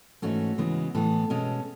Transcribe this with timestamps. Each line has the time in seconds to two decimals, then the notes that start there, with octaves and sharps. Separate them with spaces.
0.22 G#2 E3 A3 C#4 F#4
0.58 C#3 E3 G#3 B3
0.94 A2 E3 B3 A4
1.30 B2 G#3 C#4